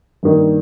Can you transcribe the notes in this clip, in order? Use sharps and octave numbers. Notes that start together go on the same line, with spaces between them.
G2 D#3 A#3